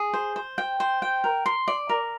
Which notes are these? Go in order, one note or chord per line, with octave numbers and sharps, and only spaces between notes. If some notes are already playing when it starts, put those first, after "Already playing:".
Already playing: G#4
C5
C5
G5
C5
G5
A#4
C6
D5
A#4